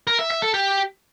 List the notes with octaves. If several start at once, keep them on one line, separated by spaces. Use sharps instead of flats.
A#4
E5
E5
A4
G4